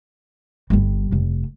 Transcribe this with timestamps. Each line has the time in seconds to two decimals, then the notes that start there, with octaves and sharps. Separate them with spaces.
0.70 G1 G3
1.12 F1